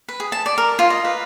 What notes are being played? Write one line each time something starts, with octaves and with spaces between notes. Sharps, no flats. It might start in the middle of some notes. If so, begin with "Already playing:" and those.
B4
G#4
A5
D5
A#4
F4
D#5
B4